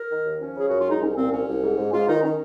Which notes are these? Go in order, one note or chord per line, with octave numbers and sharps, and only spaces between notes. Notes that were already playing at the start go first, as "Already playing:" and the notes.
Already playing: A#4
D#3
D#2
F3 C#4
C#3 G#4
F#2 F#4
F4
G#3 D#4
C2 C#4
A#2 C4
C2 C#4
C2
G#2
G#2
G#2 F4
D#3 D#4
D#3 C#4